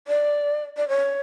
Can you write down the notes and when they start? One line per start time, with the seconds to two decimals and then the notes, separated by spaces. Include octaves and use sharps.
0.08 D5
0.77 D5
0.88 C#5